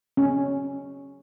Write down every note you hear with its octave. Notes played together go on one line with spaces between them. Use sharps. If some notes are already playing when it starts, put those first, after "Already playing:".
C#4